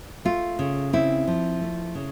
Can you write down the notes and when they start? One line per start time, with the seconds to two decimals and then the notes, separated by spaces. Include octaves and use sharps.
0.25 A3 F4
0.59 C#3
0.93 C4 E4
1.27 F3
1.61 A3
1.95 C#3